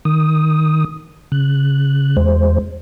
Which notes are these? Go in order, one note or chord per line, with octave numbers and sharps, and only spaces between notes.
D#3 D#6
C#3 F#6
E2 G#3 C5